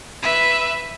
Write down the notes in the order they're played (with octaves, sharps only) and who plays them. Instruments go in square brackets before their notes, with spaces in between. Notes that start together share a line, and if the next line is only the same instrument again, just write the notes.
[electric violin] B4 E5